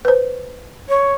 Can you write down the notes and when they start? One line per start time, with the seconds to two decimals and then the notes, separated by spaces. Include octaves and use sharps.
0.05 B4 C5
0.89 C#5